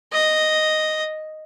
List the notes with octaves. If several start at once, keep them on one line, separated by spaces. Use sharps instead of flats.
D#5